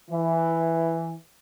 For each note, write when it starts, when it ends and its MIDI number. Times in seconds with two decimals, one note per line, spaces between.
0.10 1.14 52